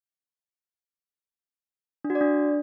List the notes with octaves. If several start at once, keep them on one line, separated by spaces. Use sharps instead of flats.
D4
F#4
D5
D4